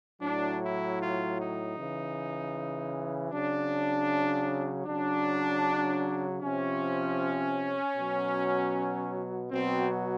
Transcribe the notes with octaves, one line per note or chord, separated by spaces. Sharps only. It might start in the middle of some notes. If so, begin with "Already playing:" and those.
A2 F#3 D4
E4
F4
D#4
C#3 E3
C#3 F#3 D4
C#3 F#3 D4
C3 F3 C#4
B2 F#3
B2 F#3 C4